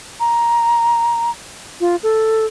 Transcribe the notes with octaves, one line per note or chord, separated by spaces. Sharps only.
A#5
F4
A4